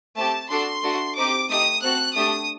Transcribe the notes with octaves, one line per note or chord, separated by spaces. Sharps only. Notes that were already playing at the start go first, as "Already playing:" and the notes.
A3 C4 G4 A5
D4 F#4 A4 C6
A3 D4 F#4 A4
C4 D#4 G4 D6
A3 D#4 G4 D#6
C4 F#4 A4 F#6
A3 D4 G4 D#6